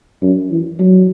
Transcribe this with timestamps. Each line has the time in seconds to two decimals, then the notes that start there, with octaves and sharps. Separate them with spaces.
0.22 F#2
0.51 E3
0.79 F#3